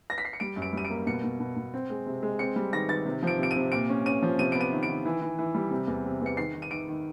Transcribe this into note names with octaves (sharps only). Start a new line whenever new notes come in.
A#6
B6
C7
C#7
G3 D7
F#2
D7
G3 D#7
D7
A#3
B2 C#7
B2
B2
B2
C4
G#3
C3
G#3
C4 C#7
G3
D#3 A#6
D#3 A6
C3
F3 D7
C3 D7
D#7
C3
A#2 D7
C#4
C#4 D#7
F3
C3 D#7
B3 D7
D#7
D#3
D7
D#3
E3
E3
E3
G3
C3
E2
C3
E2 C#7
D#3 C7
D#3
D#7
D#3 D7
D#3